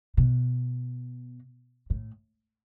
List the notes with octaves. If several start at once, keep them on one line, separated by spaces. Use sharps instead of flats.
B2
A2